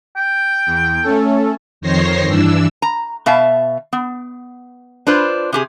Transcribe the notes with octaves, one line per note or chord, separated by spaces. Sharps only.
G5
E2
A3 C#4 A4
F2 D#3 C5 C#5 A#6 C7
G2 E3 D4 E6
A#5
B2 E5 F5 A5
B3
D4 F4 B4 C5
C3 G4 G#4